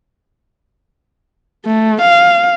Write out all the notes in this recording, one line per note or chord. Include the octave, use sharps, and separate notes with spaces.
A3
F5